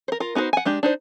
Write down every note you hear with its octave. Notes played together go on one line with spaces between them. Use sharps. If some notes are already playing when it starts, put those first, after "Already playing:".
A#4 C5
F4 A#4
B3 D#4 F#4 A4 C5
F#5 G#5
G#3 D4 G4
D4 D#4 C5